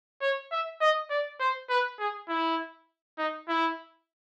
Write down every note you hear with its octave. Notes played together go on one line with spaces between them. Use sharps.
C#5
E5
D#5
D5
C5
B4
G#4
E4
D#4
E4